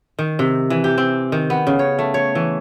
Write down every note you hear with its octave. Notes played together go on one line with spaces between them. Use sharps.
D#3
C3
E3
G4
C4
D#3
B3
C#3
C#5
A3
C#5
E3